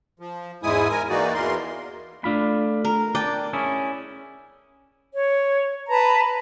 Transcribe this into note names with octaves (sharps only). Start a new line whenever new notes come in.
F3
E2 G#2 G#3 E4 G#5 D#6
A#4 G#5
E3 A#3 D#4 F#4 D5
E2 B2 E3 A#4 C6
A3 D4 F4 B5
A#4
D4 D5 G5
C#4 E4 G#4
C#5
B4 A5 A#5